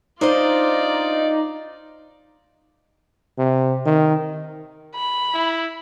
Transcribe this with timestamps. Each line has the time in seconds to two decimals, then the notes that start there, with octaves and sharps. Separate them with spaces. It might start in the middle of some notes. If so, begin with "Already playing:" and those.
0.21 D4 D#4 F4 C5 D5 D#5
3.38 C3
3.86 D#3
4.95 B5
5.34 E4